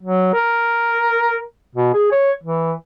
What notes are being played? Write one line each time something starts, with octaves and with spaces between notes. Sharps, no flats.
F#3
A#4
B2
G#4
C#5
E3